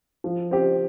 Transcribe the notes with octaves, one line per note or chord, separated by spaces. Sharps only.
F3
C4 G4